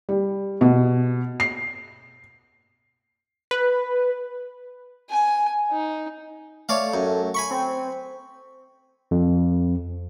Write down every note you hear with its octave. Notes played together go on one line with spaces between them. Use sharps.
G3
B2
C7
B4
G#5
D#4
A3 C#5 D5 F5
F#2
G#5 B5 C#6
C4
F2